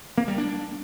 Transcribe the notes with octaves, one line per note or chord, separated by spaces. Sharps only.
A#3
G3
D4